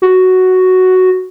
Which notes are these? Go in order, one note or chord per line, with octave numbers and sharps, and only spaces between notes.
F#4